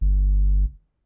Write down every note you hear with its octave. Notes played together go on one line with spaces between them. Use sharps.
G1